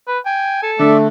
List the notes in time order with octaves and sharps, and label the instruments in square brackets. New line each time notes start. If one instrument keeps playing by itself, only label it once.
[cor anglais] B4
[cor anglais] G5 [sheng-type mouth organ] G#5
[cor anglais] A4
[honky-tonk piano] D3 [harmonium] A3 [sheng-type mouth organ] D5 E5